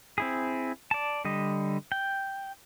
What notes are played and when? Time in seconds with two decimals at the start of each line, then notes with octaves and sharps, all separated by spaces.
0.18 C4 E4 G#4
0.91 D5 A5
1.25 D3 G3 D#5
1.92 G5